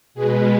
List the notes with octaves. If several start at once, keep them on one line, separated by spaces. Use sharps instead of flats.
B2 G#3 B3 G#4